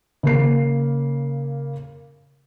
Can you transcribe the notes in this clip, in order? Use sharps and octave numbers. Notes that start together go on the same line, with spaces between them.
C#3 A#3 C7